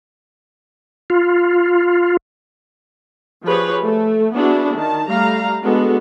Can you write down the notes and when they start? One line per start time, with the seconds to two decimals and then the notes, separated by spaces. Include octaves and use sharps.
1.10 F4
3.45 F3 G4 G#4 B4 C#5
3.84 A3
4.34 B3 D4 E4 F#4 G#4
4.75 D#3 A5
5.09 G3 A3 F5 A#5
5.63 G#3 B3 D4 F#4 A4